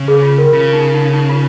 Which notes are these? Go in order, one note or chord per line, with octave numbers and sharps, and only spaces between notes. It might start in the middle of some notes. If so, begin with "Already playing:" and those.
Already playing: C#3
G#4
F4
A#4
C#3 F4
D#4
D#4
D#4
F4